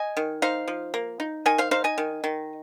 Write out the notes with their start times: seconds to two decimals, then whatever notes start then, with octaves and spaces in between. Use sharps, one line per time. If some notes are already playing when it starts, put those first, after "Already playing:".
Already playing: D#5 G#5
0.17 D#3
0.42 D#4 C5 F5
0.68 F3
0.94 A#3
1.20 D#4
1.46 D#3 D#5 G#5
1.58 C5 F5
1.71 D#4 C5 F5
1.84 D#5 G#5
1.98 D#3
2.24 D#3